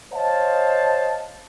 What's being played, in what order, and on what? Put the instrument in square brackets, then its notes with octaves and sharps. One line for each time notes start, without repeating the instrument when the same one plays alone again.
[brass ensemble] C5 C#5 D#5 F5 A5